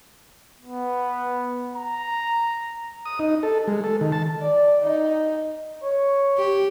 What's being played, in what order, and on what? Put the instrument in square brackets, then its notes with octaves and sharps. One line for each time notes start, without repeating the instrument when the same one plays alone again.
[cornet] B3
A#5
[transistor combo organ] D#6
D#4
A4
G#3
A4
D#3
A5
[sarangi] D5
D#4
[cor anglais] C#5
[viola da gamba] G4